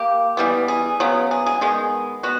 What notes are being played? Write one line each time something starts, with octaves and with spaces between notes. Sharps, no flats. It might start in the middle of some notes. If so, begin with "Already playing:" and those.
Already playing: A#3 G4
E3 G3 B3
G#4
C#3 F#3 B3
G#4
G#4
D#3 G#3 B3 G#4
B3 F#4